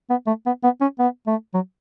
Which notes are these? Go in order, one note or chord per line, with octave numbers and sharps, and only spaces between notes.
B3
A3
B3
B3
C#4
B3
A3
F#3